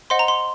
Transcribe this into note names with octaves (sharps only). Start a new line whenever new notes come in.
C5 D#5 F#5 C6
A#5
C6